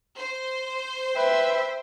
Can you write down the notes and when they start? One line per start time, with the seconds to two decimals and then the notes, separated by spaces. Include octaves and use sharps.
0.16 C5
1.17 B4 E5 G5